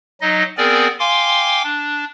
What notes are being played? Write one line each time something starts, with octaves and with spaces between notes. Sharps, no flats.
F#3 D#4 D#5
B3 C4 G#4 A#4 D5 G#5
F5 G5 G#5 C6 D6
D4